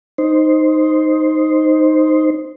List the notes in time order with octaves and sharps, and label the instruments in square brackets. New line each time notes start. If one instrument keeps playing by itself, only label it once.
[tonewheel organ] D#4 C5